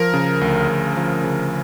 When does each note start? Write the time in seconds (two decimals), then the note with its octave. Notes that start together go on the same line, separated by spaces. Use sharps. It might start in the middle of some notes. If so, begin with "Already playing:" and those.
Already playing: F3 A#4
0.14 C#3
0.41 D2
0.69 D2
0.97 F3
1.24 C#3